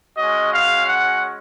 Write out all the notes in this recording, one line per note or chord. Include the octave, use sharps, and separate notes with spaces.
G#3 C#4 F#4 D#5
F5
F#5